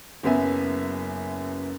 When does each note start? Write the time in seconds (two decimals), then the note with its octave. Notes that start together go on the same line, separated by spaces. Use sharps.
0.23 F#1 F#2 B3 E5 G#5